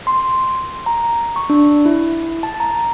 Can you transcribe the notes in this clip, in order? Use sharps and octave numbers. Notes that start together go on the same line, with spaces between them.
C6
A#5
C#6
D4
E4
A5
A#5